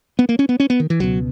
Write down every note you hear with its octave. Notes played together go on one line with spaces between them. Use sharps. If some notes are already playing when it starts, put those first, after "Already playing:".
B3
A#3
C#4
B3
C#4
B3
D#3
E3
C#2 B2 F#3